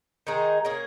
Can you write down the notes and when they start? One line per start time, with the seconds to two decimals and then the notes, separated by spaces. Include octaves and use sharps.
0.27 D#3 G#3 D#4 G#4
0.65 A#3 C#4 G#4